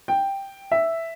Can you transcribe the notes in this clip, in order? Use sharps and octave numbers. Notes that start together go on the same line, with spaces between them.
G5
E5